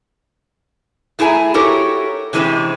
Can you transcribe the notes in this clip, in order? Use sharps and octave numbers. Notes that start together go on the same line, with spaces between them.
A3 E4 G#4 G5 G#5 A#5
F#4 G4 A4 A#4 C#5
C3 E3 G#3 A3 C4 C#4